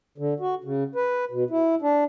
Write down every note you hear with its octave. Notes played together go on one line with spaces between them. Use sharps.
D3
F#4
C#3
B4
B2
E4
D4